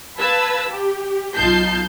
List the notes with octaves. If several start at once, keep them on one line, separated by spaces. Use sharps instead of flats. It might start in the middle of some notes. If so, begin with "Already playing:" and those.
B4 F5 A5 B5 E6 G#6
G4
B1 D#4 F4 A5 G6 C7